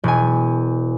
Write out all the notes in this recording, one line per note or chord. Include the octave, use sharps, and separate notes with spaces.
E1 G#5